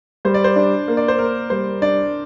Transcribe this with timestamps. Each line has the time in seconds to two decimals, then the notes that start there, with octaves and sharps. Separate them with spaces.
0.25 G3 C5
0.34 D5
0.44 C5
0.56 D4
0.88 A#3
0.97 D5
1.08 C5
1.18 A#3 A#4
1.50 G3 C5
1.81 D4 D5